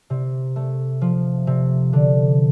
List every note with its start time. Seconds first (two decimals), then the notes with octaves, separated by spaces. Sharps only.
0.10 C3
0.56 A3
1.01 F3
1.47 C3
1.93 D3